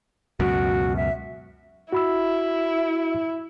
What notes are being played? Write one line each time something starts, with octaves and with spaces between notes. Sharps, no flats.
C#2 F#2 B2 F#4
E5
E4 F#4 B5 E6